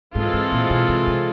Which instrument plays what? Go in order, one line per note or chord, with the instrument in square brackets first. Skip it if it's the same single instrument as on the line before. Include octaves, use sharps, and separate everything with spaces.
[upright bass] G#2 [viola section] E3 G#3 C4 F4 A4
[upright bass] G#2
A#2
B2
C3
C3